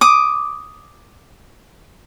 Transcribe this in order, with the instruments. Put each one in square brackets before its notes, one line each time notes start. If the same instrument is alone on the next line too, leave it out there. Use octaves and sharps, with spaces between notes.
[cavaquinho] D6 D#6